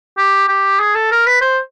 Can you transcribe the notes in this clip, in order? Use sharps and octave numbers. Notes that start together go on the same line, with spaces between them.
G4
G4
G#4
A4
A#4
B4
C5